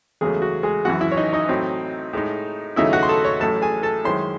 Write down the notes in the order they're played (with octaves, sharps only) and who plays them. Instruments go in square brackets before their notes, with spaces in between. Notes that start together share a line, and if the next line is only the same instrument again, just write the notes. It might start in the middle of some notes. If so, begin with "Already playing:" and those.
[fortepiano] E2 C#3 F#3 G#3 A3 G#4
F#4
G#3 G#4
G#1 F#2 E3 F#4 F#5
E4 E5
C#5
D#4 D#5
D#4 D#5
A2 F#3 C4
A2 G#3 D#4
D#2 C#3 F#3 A3 D#4 E4 E5
F#4 F#5
C6
A4 A5
C#5 C#6
A1 A2 F#3 A3 A4 A5
G#4 G#5
A4 A5
F#2 D#3 G#3 C#4 E4 C5 C6